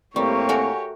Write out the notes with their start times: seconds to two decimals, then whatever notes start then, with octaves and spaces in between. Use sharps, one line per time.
0.16 A2 G3 A#3 C4 G4 C#5 D5 C#6
0.49 A3 F#4 A#4 F#5 G#5